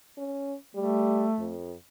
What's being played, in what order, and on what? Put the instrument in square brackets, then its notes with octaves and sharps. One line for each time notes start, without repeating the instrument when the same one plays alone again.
[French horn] C#4
[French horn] G3 [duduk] A3
[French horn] F2